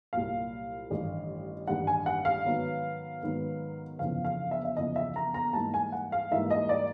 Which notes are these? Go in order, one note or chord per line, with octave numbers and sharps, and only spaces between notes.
C2 A#2 F#3 F5
A1 G2 D#3 G3
A1 G2 D#3 G3 F#5
G#5
F#5
F5
G#2 D#3 F#3 B3
G#2 D#3 F#3 B3
G1 F2 C#3 E3 F5
F5
E5
E5
G1 F2 C#3 E3 D#5
E5
A#5
A#5
G#2 E3 G3 A#3 D#4 A5
G#5
F#5
F5
G#2 E3 G3 A#3 D#4 E5
D#5
D5